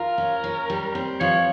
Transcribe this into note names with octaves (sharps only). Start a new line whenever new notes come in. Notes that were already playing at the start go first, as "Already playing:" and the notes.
Already playing: F4 A#4
C#4
C#4
G3
C4
F3 C#5